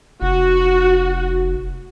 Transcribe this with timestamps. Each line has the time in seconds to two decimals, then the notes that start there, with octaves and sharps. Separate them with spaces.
0.22 F1 F#4